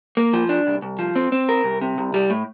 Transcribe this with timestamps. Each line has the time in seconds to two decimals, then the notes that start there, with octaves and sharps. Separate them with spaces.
0.17 A#3
0.33 F3
0.49 D4
0.67 C2
0.82 C2
0.99 F3
1.16 C4
1.32 C4
1.49 A#4
1.64 C2
1.82 C3
1.98 C2
2.14 G3
2.30 A2